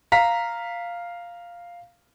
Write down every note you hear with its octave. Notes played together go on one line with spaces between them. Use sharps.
F5 A#5 B6